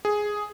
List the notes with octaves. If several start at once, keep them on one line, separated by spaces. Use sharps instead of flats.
G#4